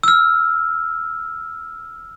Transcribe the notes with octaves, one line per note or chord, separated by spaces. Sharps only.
E6 F6